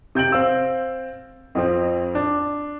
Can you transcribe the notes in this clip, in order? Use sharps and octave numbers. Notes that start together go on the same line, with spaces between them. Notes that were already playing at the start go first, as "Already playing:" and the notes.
C3 G6 D7 F#7
C4 F5 E6
F2 F3 C4
D4